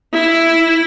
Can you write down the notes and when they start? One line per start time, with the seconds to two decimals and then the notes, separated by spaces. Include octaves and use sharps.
0.13 E4